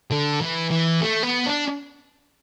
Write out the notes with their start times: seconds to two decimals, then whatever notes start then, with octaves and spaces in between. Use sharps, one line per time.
0.11 D3
0.41 E3
0.71 E3
1.01 A3
1.23 B3
1.46 D4